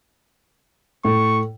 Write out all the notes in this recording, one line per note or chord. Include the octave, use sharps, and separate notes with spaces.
A2 C#6